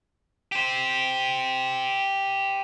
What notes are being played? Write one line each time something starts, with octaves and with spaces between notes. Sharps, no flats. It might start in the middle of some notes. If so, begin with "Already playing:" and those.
G4 C5